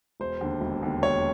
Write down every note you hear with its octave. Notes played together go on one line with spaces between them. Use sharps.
E1 C5
D#2 D3
E1
D#2 D3
E1 C#5